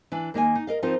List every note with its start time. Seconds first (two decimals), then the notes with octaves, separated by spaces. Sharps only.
0.12 E3 D4 E4
0.34 D#3 A#3 D#5 G#5
0.55 D#4
0.67 A#4 D#5 F5
0.82 F3 C4 D#4 F4 A#4 C5